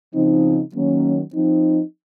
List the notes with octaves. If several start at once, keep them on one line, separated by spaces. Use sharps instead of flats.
C#3 F3 C4 D#4
D#3 F#3 A#3 C#4
F3 C4 D#4